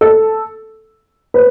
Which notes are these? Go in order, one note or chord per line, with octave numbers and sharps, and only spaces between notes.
A4
B4